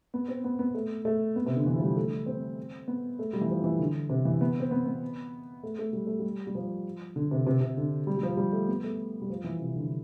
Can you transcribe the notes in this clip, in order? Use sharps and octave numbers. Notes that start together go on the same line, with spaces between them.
B3
C4
B3
B3
A3
A3
B3
C3
D3
E3
F3
G3
A3
C4
B3
A3
G3
E3
F3
E3
D3
C3
E3
B3
C4
B3
B3
A3
A3
G3
A3
G3
G3
F3
D3
C3
C3
C3
D3
G3
G3
F3
G3
A3
B3
A3
G3
F3
E3
C3
D3